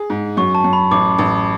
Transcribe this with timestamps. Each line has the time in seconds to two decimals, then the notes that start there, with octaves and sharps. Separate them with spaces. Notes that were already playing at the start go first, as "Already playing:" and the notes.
Already playing: G#4
0.10 G#2
0.37 F#2 C#6
0.55 A5
0.64 F#2
0.73 B5
0.91 A1 D6
1.19 A1